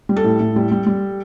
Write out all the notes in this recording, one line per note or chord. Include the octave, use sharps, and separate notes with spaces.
G3
A4
A2
A2
G3
G3
G3